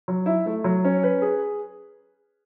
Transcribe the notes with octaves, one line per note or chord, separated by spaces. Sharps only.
F#3
E4
A3
F#3
C#4
B4
G#4